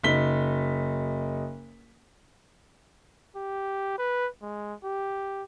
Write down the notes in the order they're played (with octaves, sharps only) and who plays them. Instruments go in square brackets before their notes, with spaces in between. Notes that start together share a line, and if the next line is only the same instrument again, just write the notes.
[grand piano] F#1 D#4 B6 G7
[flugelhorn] G4
B4
G#3
G4